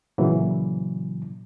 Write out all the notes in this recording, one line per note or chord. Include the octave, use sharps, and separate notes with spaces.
A#2 C#3 E3 F#3